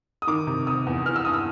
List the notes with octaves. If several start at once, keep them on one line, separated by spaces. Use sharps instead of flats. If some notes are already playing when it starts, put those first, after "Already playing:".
D#6
D#3 D6
C3
C3 D#6
E2
E3 F6
E6
G2 D#6
E6